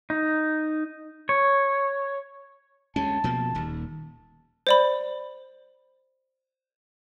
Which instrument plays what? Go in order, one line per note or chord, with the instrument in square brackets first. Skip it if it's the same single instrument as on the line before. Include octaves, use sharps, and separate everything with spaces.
[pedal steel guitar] D#4
C#5
[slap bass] D2 G#3 C#4 [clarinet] A5
[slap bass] B2 F3 A#3
D#1 D#2
[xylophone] C5 D5 B5